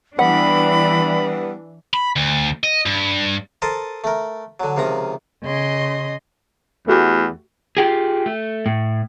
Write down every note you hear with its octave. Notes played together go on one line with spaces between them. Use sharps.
E3 G3 B3 D4 F#5 B5
B5
D2
D#5
G2
A4 A#4 C5 D#5 A5
A3 A#4
D3 F#3
C#2 C3 D#3 F3 A#5
C#3 D#5 C6
E2 A3 F#4 G4
F4 G4 G#4
A3
A2